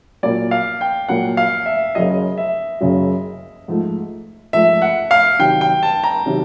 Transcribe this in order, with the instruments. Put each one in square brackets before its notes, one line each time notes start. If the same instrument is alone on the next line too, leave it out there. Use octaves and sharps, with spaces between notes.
[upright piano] A#2 F#3 A#3 [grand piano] D5
[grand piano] F5
G5
[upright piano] A#2 F#3 A#3 [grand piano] F#5
[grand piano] F5
E5
[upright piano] F#1 F#2 C#3 F#3 [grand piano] D#5
[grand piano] E5
[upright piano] F#1 F#2 C#3 F#3
G#2 F3 A3
[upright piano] G#2 F3 A3 [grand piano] E5
[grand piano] F#5
F5
[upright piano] C3 D#3 F#3 [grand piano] G5
[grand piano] G5
A5
A#5
[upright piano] C3 D#3 F#3